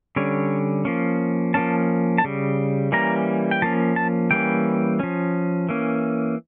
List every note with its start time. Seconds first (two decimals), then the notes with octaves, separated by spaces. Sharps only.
0.16 D3 G3 C#4 C#5
0.85 F3 A#3 C#4
1.54 F3 A#3 C#4 A5
2.18 A5
2.24 C#3 G3
2.92 E3 G3 A#3 C#4 A#5
3.51 G5
3.62 F3 A#3 C#4 A5
3.96 A5
4.31 E3 G3 A#3 C#4 G5
5.00 F3 C#4
5.69 E3 A#3 C#4